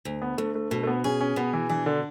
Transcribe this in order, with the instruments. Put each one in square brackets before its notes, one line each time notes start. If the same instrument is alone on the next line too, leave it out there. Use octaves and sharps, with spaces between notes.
[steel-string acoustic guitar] D2
[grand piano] B3
[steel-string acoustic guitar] D2 [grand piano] A3
[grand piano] A3
[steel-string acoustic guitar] B2 [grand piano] A3
[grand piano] A3
B3
[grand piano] C#4 [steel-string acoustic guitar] G#4
[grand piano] C#4
[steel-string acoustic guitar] B2 [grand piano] B3
[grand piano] E3
[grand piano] E3 [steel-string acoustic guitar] D4
[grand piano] D3